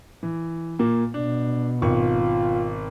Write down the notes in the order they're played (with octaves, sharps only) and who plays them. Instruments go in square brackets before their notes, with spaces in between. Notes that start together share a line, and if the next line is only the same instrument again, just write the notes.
[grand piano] E3
A#2 A#3
[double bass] B2 [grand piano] D4
[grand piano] G#1 C#6 [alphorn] F4